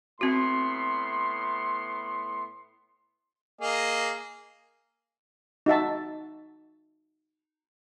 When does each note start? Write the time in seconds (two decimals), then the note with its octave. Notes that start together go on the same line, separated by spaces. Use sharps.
0.21 A2 B3 C4 F#4 C6
3.61 A#3 G#4 D#5
5.66 D#4 F#4 E5 A5